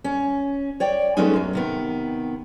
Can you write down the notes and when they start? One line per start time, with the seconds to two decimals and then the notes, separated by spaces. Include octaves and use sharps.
0.04 C#4
0.80 C#5 D5 G5
1.17 F#3 G#3 A3 B3 C#4 D#4
1.34 F#2 F#3
1.53 C3 D#3 B3